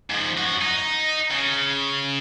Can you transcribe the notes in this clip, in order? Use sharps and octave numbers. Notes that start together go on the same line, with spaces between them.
G#2 F3
F#2 F#4
D#4
C#3